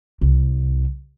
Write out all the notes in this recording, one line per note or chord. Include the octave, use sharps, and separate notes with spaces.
C2